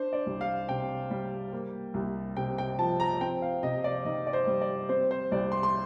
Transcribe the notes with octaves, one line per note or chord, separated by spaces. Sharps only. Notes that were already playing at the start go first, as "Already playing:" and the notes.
Already playing: D4 C5
D5
C2
F5
C3 G5
G3
A#3
C2
C3 G5
G5
F3 A5
A#5
C4 G5
F5
C3 D#5
D5
D#3 D#5
D5
C5
G3
D5
C4 C5
C5
C2 D5
C6
C6